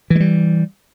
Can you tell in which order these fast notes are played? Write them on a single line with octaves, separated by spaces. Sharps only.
E3 G#3 G3